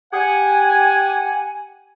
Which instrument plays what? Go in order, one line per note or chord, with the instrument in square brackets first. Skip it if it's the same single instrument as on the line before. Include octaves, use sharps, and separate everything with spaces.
[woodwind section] G4 F#5 G#5